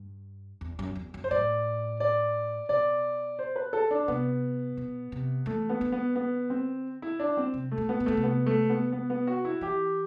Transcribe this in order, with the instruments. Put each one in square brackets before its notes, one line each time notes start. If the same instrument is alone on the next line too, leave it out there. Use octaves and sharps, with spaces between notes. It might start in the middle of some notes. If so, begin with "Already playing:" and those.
Already playing: [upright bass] G2
E2
F#2
E2
F#2
[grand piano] C5
[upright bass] A2 [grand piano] D5
[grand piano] D5
[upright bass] B2 [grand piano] D5
[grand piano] C5
B4
A4
D4
[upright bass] C3 [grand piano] B3
[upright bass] B2
C3
[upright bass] E3 [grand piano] A3
[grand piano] B3
[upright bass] D3
[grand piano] B3
B3
C4
E4
D4
C4
[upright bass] C3
[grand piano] A3
[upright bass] B2
[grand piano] B3
[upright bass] C3
[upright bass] B2 [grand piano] A3
[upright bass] C3
[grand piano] B3
A3
B3
B3
B3
F#4
E4
[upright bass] E3 [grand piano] G4